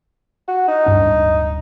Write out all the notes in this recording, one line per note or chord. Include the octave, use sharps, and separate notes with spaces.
F#4
D#4
D1 G2 D4